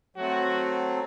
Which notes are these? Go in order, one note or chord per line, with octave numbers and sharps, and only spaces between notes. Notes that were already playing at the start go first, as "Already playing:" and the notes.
F#3 A3 C4 F#4